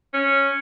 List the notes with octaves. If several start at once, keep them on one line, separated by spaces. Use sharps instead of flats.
C#4